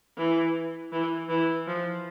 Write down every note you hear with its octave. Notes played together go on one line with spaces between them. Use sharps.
E3
E3
E3
F3